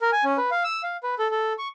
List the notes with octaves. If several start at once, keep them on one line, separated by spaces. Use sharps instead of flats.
A#4
G#5
C#4
B4
F5
E6
F5
B4
A4
A4
C#6